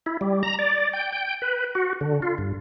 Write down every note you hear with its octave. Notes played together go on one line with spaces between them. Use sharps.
E4
G3
A#5
D5
G5
G5
B4
F#4
D3
F4
G2